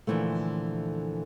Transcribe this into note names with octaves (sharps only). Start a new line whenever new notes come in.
A#2 D3 E3 F3 A3